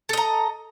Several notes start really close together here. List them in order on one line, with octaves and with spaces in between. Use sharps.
A4 D#5 A#5